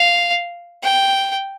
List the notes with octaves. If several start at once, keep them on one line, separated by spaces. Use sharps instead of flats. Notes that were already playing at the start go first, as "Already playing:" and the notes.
Already playing: F5
G5